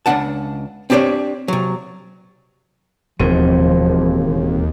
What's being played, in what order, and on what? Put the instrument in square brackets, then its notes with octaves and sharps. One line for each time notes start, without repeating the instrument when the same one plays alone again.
[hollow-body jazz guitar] C#2 A3 D4 F#5 A5
C4 D4 G4 A4 C#5 D5
C3 F#3
[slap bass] E1 A2 [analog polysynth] D#2 [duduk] F3 [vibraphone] C4